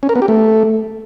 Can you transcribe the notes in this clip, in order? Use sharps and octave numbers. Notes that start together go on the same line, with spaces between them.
C#4
A#4
B3
G4
A3